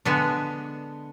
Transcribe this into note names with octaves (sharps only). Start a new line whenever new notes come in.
D3 G#3 B3 D4